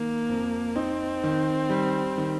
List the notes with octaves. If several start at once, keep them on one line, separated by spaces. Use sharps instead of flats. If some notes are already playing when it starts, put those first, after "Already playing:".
Already playing: D#3 A#3
F2
C4 D#4
D#3
G3
D#3